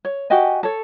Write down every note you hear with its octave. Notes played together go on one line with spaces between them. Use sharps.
C#5
F#4 G4 D#5 G#5
A4 C#5